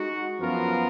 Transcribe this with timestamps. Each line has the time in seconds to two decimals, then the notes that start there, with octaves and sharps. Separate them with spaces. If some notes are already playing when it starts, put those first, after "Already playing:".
Already playing: G#3 D#4 F#4
0.40 F#2 F3 B3 F4 A#4